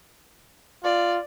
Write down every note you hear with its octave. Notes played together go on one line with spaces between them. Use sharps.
F4 D5